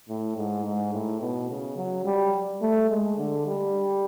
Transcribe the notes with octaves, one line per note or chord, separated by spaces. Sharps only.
A2
G#2
G#2
A2
B2
C#3
F#3
G3
A3
G#3
D3
G3